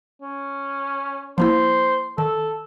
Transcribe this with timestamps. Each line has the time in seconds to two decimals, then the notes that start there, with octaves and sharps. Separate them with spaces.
0.22 C#4
1.38 F3 A#3 E4 C5
2.18 D#3 A4